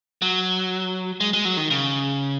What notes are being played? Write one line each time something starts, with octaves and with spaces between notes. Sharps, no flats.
F#3
G#3
G#3
F#3
D#3
C#3